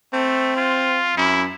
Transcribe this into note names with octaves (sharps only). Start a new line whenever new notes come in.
A3 C4
F4
F#2 E4